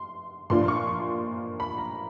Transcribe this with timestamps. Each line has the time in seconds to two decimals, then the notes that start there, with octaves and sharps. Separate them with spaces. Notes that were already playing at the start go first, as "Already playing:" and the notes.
Already playing: C6
0.50 A#2 F3 A#3 D4 F4 C6
0.63 C6
0.68 C#6
0.88 C6
1.60 B5
1.78 A#5